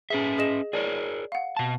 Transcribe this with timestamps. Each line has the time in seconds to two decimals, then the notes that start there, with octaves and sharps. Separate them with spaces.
0.10 C#4 G#4 B4 E5
0.38 G#4 D#5 E7
0.73 G#4 A#4 C#5 D5
1.32 F5 F#5
1.57 B2 A5